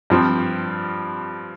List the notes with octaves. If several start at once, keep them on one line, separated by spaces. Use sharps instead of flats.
G2 F3 C4